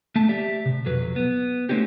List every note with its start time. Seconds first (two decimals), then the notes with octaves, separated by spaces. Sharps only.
0.16 A3 A5
0.29 G4 D5 E5
0.66 C3
0.85 B1 F2 F#3 B4
1.16 B3
1.69 A3 C4 C#4 D#4 G4